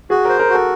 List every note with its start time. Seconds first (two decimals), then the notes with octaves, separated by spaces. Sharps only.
0.10 F#4 G#4
0.25 A#4 C5
0.39 A#4
0.50 F#4 A4